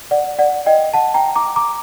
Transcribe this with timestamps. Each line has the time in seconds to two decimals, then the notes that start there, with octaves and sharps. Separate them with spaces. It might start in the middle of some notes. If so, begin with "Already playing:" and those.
0.11 D5 F#5
0.39 D5 F#5
0.66 D#5 G5
0.94 F#5 A5
1.14 G5 A#5
1.35 A#5 D6
1.56 A#5 D6